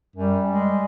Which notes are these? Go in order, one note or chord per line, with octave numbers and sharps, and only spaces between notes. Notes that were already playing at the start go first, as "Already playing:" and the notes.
F#2 G3
G#3